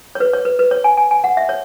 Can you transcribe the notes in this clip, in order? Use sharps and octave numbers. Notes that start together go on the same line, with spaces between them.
C#5
B4
C#5
B4
B4
C#5
G#5
G#5
G#5
F#5
E5
C#5